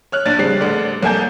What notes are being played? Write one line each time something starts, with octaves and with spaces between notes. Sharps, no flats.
C#5 F6 F#6
A#1 D4 C#5 A6
C#3 G3 C4 D4 C7
A1 D3 D4
C2 A#3 A4 G#5 A5 G6